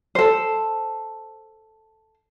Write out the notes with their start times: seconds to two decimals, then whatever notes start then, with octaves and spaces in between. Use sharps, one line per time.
0.15 A4 C5